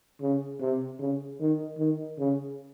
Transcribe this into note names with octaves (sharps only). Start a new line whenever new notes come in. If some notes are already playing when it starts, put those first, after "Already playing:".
C#3
C3
C#3
D#3
D#3
C#3